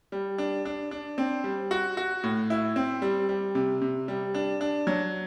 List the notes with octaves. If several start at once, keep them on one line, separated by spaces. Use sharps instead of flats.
G3
D4
D4
D4
C4
G3
F#4
F#4
A2
E4
C4
G3
G3
C3
C3
G3
D4
D4
F#3